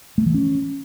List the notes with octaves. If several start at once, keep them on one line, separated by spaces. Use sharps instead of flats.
A3
E3
C#4